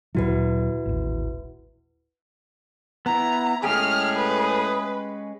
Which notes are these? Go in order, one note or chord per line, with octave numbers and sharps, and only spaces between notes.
D2 A#2 F#3 E4 F#4 B4
D#1 A1
B3 E4 A#5
A2 G#3 A3 C#4 G4 G#4 F6
B4